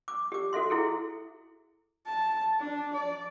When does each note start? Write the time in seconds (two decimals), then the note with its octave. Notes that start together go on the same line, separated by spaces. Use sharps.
0.08 D6
0.32 G4 D6
0.53 F#4 A4 E5 C6
0.70 E4 G#4 A4
2.06 A5
2.60 D4
2.93 D5